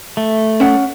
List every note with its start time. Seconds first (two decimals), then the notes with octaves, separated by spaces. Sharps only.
0.17 A3
0.60 C#4 F#5